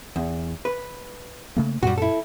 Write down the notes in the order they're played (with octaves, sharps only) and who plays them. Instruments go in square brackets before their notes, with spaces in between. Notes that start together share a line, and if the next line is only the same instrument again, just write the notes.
[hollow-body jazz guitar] E2
B4
[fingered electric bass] C#3 A3 A#3
[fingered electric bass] F#2 A#2 [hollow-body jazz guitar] G3 F#4
[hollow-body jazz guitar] E4 A4